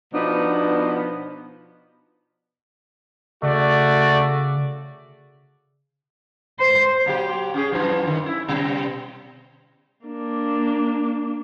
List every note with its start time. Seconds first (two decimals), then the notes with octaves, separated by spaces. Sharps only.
0.14 B2 F3 B3 D4 D#4
3.43 C#3 A3 F#4 D5
6.59 C5
7.06 A#2 F#3 G4
7.54 C#4 G4 G#4
7.72 F#2 E3 F3
8.07 D#3
8.24 C#4 E4
8.48 B2 G3
10.05 A#3 D4